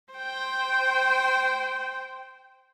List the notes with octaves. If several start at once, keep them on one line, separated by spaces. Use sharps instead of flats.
C5 G5